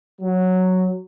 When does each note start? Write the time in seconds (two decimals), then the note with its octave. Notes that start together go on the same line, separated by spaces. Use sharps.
0.21 F#3